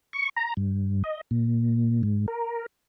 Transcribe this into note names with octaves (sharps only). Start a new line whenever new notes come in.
C#6
A#5
G2
D#5
A#2
G#2
A#4